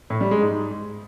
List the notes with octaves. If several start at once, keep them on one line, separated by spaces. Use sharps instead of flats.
A2
G3
G#3
G#2